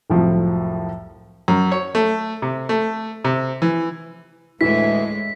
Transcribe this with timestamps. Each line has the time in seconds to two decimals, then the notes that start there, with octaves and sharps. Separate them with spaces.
0.10 C2 F2 A2 F3 F#3
1.48 F#2
1.72 C#5
1.95 A3
2.42 C3
2.69 A3
3.24 C3
3.62 E3
4.61 D2 A2 E3 G#3 E4 B6